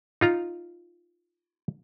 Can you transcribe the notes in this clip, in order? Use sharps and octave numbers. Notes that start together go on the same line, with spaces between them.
D#4 F4 A#5